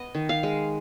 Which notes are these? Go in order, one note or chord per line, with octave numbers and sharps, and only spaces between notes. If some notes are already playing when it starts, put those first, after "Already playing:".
Already playing: B3 D#5
D#3
F5
G#3